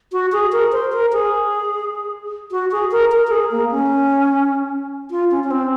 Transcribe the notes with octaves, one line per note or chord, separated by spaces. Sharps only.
F#4
G#4
A#4
C5
A#4
G#4
F#4
G#4
A#4
A#4
A#4
G#4
A#3
C#4
F4
C#4
C#4
C4